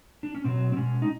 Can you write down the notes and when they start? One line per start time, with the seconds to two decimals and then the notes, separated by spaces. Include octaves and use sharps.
0.23 D4
0.35 C#4
0.44 B2 F#3 C4
0.72 C4
0.77 B2 G#3 C#4
1.02 D#4